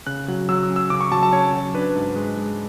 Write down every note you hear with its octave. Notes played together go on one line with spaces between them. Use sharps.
C#3 F#6
F#3
F#3 E6
E6
C#4
E6
C#3 D6
C#6
F#3 A5
A5
C#4 C#5
F#3
D4 B4
G#2
G#3
G#3